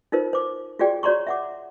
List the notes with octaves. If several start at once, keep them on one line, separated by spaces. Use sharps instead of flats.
D#4 F4 A#4 C5
C5 D6
F4 F#4 G#4 D5 G5
F#4 C#5 D5 A#5 C6 C#6
E5 F#5 D6